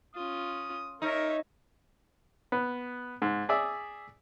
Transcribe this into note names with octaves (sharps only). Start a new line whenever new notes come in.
C#4 F4 D#6
D#4 A#4 C#5 E5
B3
G#2
G#4 D5 E5